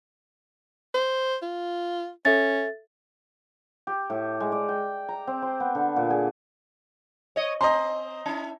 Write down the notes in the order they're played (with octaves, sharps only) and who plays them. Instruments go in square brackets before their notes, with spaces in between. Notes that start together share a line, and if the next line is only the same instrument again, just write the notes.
[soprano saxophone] C5
F4
[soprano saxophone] C#4 [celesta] A4 E5 A6
[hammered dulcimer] G4
A2
G#3
D5
G5
A#5
C4
C5
B3
D3
A#2
G#4
[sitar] C#5 D#5
[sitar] C4 [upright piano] D#5 A#5 C6
[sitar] C#4 E4